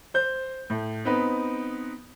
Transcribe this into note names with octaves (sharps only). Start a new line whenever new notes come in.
C5 G6
A2
B3 C4 D#4 B4